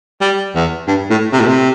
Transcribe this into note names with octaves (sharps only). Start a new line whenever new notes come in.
G3
E2
G2
A2
C3
A2
C3